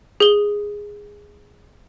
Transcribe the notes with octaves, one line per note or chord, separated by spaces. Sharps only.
G#4 G7